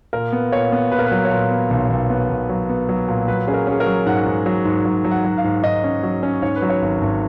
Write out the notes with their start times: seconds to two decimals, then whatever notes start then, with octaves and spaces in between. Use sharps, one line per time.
0.13 A#2 A#4
0.32 B3
0.52 A#2 C#5
0.72 B3
0.91 A#2 B4
0.99 A#4
1.07 B4
1.12 F#3
1.25 C#5
1.31 A#2 B4
1.50 B3
1.70 B1
1.90 B1
2.10 B3
2.30 B1
2.49 F#3
2.69 B3
2.89 F#3
3.08 A#2
3.28 F#3 B4
3.47 C#4 G#4
3.54 A#4
3.67 C#4 G#4
3.80 A#4
3.86 F#3
4.06 G#2 F#5
4.26 G#2
4.46 F#3
4.65 G#2
4.85 F#3
5.04 F#3
5.11 F#5
5.24 F#3
5.38 F5
5.44 G#2
5.64 G#2 D#5
5.84 C#4
6.03 F#3
6.23 C#4
6.42 G#2 C#5
6.56 B4
6.62 F#3
6.70 C#5
6.82 G#1
7.02 G#1